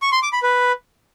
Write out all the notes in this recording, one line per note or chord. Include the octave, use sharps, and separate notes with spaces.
C#6
C6
D6
B5
B4